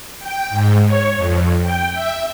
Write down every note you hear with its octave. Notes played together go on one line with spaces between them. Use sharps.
G5
G#2
C#5
F2
G5
E5